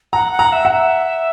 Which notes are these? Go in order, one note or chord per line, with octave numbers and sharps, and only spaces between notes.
F#5 A#5
F#5
A#5
E5
F#5
E5